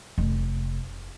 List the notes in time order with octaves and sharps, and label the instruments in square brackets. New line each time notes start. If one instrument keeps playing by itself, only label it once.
[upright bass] F1